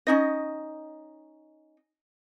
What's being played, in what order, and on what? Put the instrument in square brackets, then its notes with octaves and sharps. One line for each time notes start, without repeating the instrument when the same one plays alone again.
[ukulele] C#4 D#4 D#5